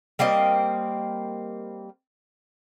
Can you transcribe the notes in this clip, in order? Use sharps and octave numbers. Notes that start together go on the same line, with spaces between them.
G3 A#3 C4 D#5